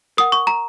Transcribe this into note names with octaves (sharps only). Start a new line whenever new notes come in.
A#4 F#5 D#6
C#6
A#5